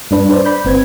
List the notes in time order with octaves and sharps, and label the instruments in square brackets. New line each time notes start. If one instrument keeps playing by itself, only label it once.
[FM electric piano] G2 D4 B4
D4 B4 C5 D5
D5 B5 G6
G1 C4 B4 G#6